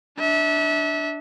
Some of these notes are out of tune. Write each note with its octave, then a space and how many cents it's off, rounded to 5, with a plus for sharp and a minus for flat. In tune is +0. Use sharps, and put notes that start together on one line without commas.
D4 +0 E5 -30